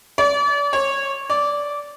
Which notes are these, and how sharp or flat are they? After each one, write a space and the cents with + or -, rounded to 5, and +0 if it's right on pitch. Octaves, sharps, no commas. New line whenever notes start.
D5 -40
C#5 -20
D5 -15